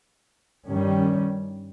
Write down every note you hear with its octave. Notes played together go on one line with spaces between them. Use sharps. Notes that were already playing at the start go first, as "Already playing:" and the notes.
G2 D#3 G3 C#4